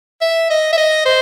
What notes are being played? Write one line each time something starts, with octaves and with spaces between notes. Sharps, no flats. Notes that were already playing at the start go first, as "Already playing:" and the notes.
E5
D#5
E5
D#5
C5